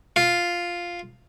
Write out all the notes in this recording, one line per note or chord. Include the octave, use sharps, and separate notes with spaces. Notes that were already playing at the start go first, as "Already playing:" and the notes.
F4